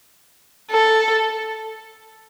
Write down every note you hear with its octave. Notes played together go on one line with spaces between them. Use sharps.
A4